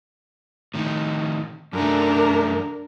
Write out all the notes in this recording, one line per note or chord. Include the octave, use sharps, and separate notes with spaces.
A2 D#3
F#2 A3 D4 A#4